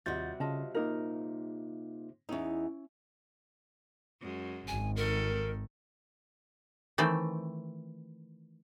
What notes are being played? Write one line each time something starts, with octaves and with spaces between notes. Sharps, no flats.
D#2 C3 G3 F4 F#4 D#5 G6 A6
C#3 F4 D#5 A5
A#3 D#4 F4 A#4
E2 C#4 D#4 E4
F#2 G#3
G#1 G#5
D#3 A4 A#4
D#3 E3 A3 C4